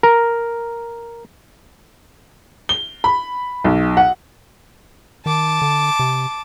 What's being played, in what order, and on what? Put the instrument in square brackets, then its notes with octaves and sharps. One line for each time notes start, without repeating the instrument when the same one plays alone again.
[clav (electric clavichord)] A#4
[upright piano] G7
B5
B1
F#5
[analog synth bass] D#3 [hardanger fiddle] A5 D6
[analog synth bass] D3
C3